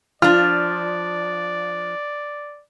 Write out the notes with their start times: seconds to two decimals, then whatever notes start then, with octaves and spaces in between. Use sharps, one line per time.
0.22 F3 D4 F4 D5 F6